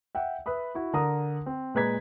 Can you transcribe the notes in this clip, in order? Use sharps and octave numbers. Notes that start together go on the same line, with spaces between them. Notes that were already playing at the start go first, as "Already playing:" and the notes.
E5 F#5 G5
B4 E5 B5 D#6
E4 F#4
D3 A#4 A#5 D#6
C4
A#2 G#3 B4 A#5 G#6 B6